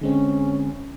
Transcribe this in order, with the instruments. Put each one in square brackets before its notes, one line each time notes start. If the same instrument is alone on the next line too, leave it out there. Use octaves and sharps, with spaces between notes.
[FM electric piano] D3 G#3 C4 [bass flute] C#4